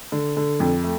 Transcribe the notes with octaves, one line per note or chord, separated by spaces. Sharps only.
D3
D3
F2
A3